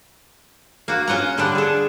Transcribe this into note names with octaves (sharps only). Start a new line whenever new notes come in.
A#3 F#4
C#4 F4 F#5 A#5
D3 G3 D4
G#4 A4